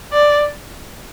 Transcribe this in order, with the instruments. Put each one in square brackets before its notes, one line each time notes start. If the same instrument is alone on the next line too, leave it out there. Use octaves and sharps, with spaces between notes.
[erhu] D5